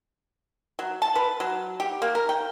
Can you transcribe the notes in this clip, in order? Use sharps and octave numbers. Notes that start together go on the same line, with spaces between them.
F#3
A5
B4
F#3
G4
A#3
A#4
G5